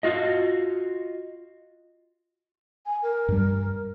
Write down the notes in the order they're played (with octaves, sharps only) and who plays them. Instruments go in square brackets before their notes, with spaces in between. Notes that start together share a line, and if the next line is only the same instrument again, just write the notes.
[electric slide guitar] F4 F#4 D#5
[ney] G#5
A#4
[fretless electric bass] G2 G3